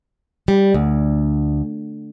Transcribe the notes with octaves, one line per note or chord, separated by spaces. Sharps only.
G3
D2